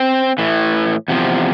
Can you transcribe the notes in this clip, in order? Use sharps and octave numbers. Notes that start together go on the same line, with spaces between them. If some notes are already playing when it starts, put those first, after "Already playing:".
Already playing: C4
A2 E3
E2 C3 F3